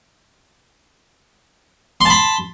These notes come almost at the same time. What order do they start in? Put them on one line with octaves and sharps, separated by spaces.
C6 A5 B5